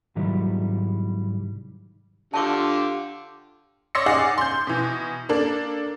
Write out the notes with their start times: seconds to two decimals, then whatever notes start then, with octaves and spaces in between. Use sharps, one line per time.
0.15 C2 G#2 D#3 F#3 G3 E4
2.34 D3 F4 G4 A5 C#6 D6
3.95 C#5 D5 C6 E6 A#6 C#7
4.06 D#4 G#4 D5 F5 F#5
4.38 C6 G6
4.67 B2 E3
5.29 A#3 D4 A4